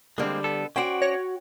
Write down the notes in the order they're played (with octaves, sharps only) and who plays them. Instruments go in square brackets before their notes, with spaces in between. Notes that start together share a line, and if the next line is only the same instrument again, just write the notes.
[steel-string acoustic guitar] D3 G3 [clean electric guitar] G#3 A#3 C4
[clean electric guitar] B3 A4
[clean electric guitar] C#4 C5 D5 [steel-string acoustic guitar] F#4 G5
[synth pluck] C#5 A#6